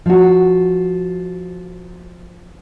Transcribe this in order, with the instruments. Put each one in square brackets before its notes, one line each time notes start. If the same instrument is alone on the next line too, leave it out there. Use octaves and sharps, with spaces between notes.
[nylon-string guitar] F3 F#4